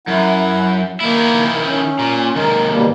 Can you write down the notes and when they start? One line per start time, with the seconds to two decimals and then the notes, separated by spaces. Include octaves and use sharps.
0.07 F#2 E4 F#5
1.00 D#3 A#3 E4
1.65 C#4
1.99 A#2
2.35 D#2 G#2 A#4
2.69 B2 G3 A#3